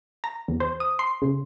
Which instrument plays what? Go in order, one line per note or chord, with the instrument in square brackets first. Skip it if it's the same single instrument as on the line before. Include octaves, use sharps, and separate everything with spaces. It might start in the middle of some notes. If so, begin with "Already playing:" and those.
[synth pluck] A#5
E2
C5
D#6
C6
C#3